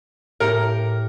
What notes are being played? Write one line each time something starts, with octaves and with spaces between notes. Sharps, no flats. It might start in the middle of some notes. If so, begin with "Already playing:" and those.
A2 G4 A#4 C#7